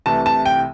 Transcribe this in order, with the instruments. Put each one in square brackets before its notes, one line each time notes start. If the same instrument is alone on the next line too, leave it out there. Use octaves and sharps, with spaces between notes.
[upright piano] C2 C3 E3 A3 A5
A5
G5